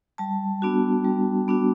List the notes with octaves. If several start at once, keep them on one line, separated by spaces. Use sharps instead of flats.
G3 A5
B3 D4 F#4
G3
B3 D4 F#4